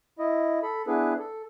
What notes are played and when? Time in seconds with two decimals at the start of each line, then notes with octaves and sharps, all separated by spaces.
0.19 E4 D#5
0.63 A4 B5
0.87 B3 D4 E4 G#4 B4
1.19 A4